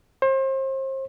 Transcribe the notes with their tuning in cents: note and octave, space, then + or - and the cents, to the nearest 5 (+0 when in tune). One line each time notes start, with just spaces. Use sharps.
C5 +35